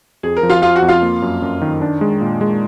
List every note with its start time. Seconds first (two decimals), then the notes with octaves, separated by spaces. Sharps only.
0.23 F2 G#4
0.37 A#4
0.43 F3
0.50 F4 F5
0.62 F3 F4 F5
0.76 F#4 F#5
0.82 F2
0.89 F4 F5
1.02 A#3
1.22 F#2
1.42 F#2
1.62 D#3
1.81 D4
2.01 G#3
2.21 A#2
2.41 G#3